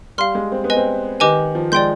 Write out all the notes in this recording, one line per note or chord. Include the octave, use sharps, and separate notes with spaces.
G3 F5 C6 F6
G#3
C4
B3
B4 D#5 G#5
C4
D#3 G4 B4 D#5 G#5 D6
F3
G#3 D5 G5 C6 G6